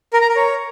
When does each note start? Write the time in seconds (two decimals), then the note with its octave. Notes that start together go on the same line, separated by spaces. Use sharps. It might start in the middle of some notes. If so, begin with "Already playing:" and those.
0.13 A#4
0.21 A#5
0.29 A#4
0.36 C#5